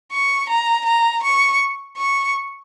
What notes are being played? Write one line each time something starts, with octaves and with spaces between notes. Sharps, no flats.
C#6
A#5
A#5
C#6
C#6